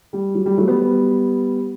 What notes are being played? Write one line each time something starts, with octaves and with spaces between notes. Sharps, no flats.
G3
F#3
G3
F#3 A3
G3 B3